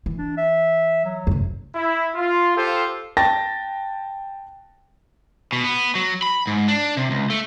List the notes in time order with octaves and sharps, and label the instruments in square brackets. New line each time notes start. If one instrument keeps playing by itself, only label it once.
[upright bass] E3
[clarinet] D4
E5
F#3
[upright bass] F#2 C#3
[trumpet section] E4
F4
F4 G4 A4 C5
[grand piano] G5 A5 A6 A#6
[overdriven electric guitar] B2
B3
F#3
B5
G#2
D4
C3
C#2
A3